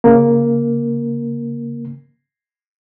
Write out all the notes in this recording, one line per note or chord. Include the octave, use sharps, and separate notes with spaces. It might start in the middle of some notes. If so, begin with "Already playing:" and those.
C#3 A#3